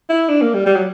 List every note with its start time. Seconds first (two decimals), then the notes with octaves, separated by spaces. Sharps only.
0.09 E4
0.29 D4
0.42 A#3
0.54 G3
0.66 G3
0.76 F#3